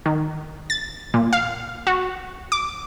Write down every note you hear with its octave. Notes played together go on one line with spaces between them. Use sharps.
D#3
A6
A#2
F5
F#4
D6